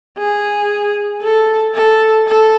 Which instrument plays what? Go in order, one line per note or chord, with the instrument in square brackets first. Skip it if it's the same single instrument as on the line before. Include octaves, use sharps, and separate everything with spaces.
[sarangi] G#4
A4
A4
A4